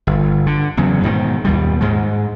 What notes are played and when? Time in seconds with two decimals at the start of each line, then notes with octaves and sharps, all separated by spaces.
0.07 G1
0.46 D3
0.77 E2 C#3 F#3
1.03 G#2 B2 D#3
1.45 D#2 B2 G3
1.81 G#2 G#3